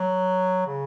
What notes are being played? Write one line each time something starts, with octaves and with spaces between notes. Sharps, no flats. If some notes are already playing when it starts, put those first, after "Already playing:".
Already playing: F#3
C#3